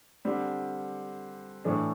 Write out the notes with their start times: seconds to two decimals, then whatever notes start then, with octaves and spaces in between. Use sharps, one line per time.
0.25 D3 G3 C4
1.64 A2 E3 A3 D4